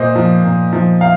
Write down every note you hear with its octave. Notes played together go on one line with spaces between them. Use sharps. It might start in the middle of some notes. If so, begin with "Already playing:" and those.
Already playing: A#2 C5 D#5
F3
A#2
F3
F5